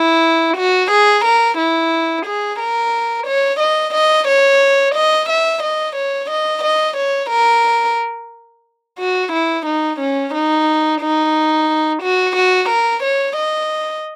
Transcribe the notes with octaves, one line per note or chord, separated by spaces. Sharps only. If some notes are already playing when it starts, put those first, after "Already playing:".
Already playing: E4
F#4
G#4
A#4
E4
G#4
A#4
C#5
D#5
D#5
C#5
D#5
E5
D#5
C#5
D#5
D#5
C#5
A#4
F#4
E4
D#4
C#4
D#4
D#4
F#4
F#4
A#4
C#5
D#5